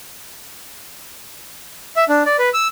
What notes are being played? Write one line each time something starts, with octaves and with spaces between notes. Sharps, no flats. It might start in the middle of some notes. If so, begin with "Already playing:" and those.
E5
D4
D5
B4
E6